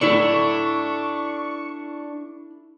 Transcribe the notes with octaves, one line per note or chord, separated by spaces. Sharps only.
D4 E4 A4 D5 C#6